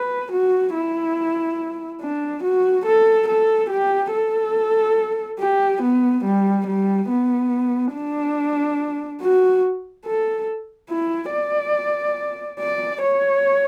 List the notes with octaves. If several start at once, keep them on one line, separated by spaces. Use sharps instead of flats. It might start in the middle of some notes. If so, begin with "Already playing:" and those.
Already playing: B4
F#4
E4
D4
F#4
A4
A4
G4
A4
G4
B3
G3
G3
B3
D4
F#4
A4
E4
D5
D5
C#5